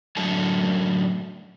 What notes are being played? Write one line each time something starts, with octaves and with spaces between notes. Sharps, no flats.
F#2 A2 D3 F#3 A3 A5